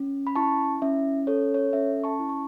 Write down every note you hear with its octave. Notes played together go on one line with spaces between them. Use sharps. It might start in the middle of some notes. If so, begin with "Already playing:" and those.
Already playing: C#4
B5
E4 A5 C#6
C#4 E5
A4 C#5
C#5
C#4 E5
A5 C#6
E4
C#6